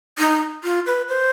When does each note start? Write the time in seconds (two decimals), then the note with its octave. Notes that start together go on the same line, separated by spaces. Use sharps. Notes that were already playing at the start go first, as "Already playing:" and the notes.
0.19 D#4
0.64 F4
0.86 B4
1.09 C5